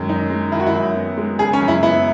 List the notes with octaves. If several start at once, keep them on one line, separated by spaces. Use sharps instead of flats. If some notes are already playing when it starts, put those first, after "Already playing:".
Already playing: F#2 D#3 G#3
D#4
G#3
D#3 E4
F#4
E4
F#2
B3
G#3
C#3 G#4
C#4
F#2
E4
B3 E4